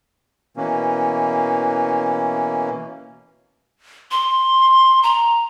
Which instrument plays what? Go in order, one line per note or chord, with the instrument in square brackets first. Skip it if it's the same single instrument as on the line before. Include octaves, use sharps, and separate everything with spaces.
[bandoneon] B2 E3 A#3 C#4
[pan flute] C6
A#5